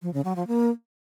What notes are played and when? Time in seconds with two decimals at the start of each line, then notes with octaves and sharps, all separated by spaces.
0.02 F3
0.14 C#3
0.25 F#3
0.36 F3
0.47 A#3